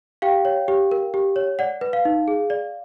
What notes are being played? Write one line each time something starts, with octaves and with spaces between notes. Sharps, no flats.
G4 F5 G5
C#5
G4
A#4
G4
C#5
D5 F#5
B4
F5
D#4
G#4
D5